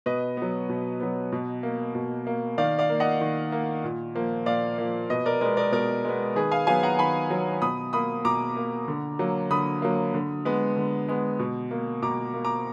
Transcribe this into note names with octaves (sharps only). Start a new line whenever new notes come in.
B2 B4 D#5
F#3 B3
B2
F#3 B3
B2
A#3
B2
A#3
D#3 D5 F5
D5 F5
A#3
D#5 F#5
D#3
A#3
A#2
F3 A#3
A#2 D5 F5
F3 A#3
B2 B4 D#5
A#4 D5
G#3 B3 A#4 D5
A#4 D5
B2 A#4 D5
G#3 B3
D#3 G#4 B4
F5 G#5
F#3 B3 F5 G#5
F#5 A#5
D#3 G#5 B5
F#3 B3
B2 B5 D#6
A#3 B5 D#6
B2 A#5 D6
A#3
D3
F#3 A#3
D3 B5 D#6
F#3 A#3
D3
G#3 B3
D3
G#3 B3
B2
A#3
B2 A#5 D6
A#3
A#5 D6